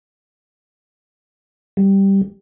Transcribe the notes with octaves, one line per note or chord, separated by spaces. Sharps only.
G3